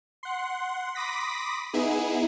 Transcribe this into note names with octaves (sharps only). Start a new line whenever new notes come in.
F#5 C6
B5 C6 D6 D#6 A#6 B6
B3 D#4 E4 G#4